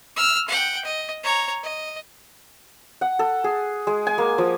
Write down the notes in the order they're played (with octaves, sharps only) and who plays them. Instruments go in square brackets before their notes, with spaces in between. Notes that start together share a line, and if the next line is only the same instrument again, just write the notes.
[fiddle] E6 F6
F#5 G5
D#5
C#5 A#5
D#5
[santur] F#5
A4
G#4
G#3
G#5
A#3
F3